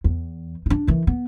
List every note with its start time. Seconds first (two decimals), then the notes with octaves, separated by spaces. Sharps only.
0.04 E2
0.66 D4 D#4
0.87 D#3 E3
1.07 B3